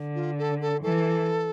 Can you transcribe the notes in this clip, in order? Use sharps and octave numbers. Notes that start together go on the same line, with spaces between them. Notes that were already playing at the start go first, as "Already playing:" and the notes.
Already playing: D3
F4
A4
A4
E3 A4